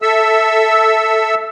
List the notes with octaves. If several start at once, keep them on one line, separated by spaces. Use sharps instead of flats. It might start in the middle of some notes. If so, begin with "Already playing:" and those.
A4 E5 E6